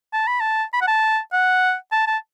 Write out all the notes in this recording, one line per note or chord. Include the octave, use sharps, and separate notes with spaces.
A5
B5
A5
B5
F#5
A5
F#5
A5
A5